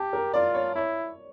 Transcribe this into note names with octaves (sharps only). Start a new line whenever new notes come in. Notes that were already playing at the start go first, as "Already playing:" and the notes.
Already playing: G4 A5
A#4
F4 D5
C#5
E4 C#5